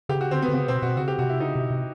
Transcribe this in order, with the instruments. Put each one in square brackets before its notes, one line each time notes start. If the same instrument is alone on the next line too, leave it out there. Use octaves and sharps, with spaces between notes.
[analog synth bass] C#3 [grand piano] G4
[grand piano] F#4
[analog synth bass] D3 [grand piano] C4
[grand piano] B3
[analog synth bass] D3
[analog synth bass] C#3 [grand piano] B3
[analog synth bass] B2 [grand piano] C4
[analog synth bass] B2 [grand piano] F#4
[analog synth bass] C#3 [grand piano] F#4
[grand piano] G4
[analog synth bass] C3 [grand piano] F#4
[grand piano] E4
[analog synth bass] C#3 [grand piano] D#4
[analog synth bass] C3
C3